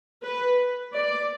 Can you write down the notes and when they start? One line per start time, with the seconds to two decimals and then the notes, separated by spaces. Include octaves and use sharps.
0.23 B4
0.94 D5